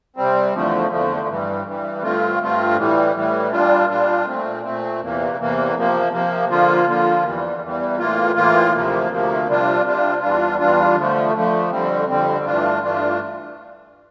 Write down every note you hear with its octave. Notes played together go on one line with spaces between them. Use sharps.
C3 G3 C4
E2 D3 F3 A3
E2 D3 F3 A3
G2 E3 G3
G2 E3 G3
G2 D3 A3 C4 F4
G2 D3 A3 C4 F4
A2 E3 G3
A2 E3 G3
A#2 G3 D4 F4
A#2 G3 D4 F4
A#2 A3 C4
A#2 A3 C4
E2 C3 E3 A#3
E2 C3 E3 A#3
C3 F3 A#3
C3 F3 A#3
D3 F3 A#3 F4
D3 F3 A#3 F4
E2 E3 G3
E2 E3 G3
A2 E3 A#3 F4
A2 E3 A#3 F4
D2 C3 F3 A#3
D2 C3 F3 A#3
C3 G3 D4 F4
C3 G3 D4 F4
E2 E3 G3 D4 F4
E2 E3 G3 D4 F4
D3 F3 A3
D3 F3 A3
F2 D3 G3 C4
F2 D3 G3 C4
G2 E3 A3 D4 F4
G2 E3 A3 D4 F4